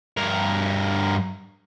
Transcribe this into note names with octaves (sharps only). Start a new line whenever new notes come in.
G2 A#4